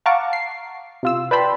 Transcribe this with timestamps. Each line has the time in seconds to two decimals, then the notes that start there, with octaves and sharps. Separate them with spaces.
0.06 F5 F#5 A5 A#5 C#6 D6
0.33 C7
1.03 C3 F4 E6
1.31 B4 D5 G5 A5 B5 C6